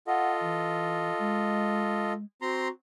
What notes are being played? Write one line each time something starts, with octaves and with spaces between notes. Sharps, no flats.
F4 A4 D#5 F#5
E3
G#3
C4 F#4 A#5 C6